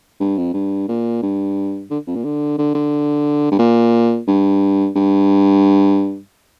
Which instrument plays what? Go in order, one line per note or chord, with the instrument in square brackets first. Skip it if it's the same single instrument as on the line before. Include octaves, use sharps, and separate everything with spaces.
[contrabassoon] G2
F2
G2
A#2
G2
D3
F2
A#2
D3
D3
D3
G2
A#2
G2
G2